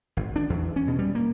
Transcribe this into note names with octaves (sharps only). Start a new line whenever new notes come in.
G#1
D4
E2
C#4
B2
G3
A#3